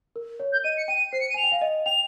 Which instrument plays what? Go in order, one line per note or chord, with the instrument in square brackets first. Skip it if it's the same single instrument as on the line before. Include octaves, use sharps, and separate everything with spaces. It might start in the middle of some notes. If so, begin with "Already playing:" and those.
[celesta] A#4
C#5
[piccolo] G6
[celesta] D#5 [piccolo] D#7
[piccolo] C#7
[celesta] G5 [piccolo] D#7
[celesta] C5 [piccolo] C7
[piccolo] C#7
D#7
[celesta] G#5 [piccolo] F7
[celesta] G5
F5
D#5
[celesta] G5 [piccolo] F7